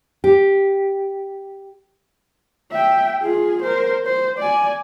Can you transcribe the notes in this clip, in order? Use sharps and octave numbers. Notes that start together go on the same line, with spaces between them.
G4
E5 G5
F4 G#4
A#4 C5
C5
D5 G#5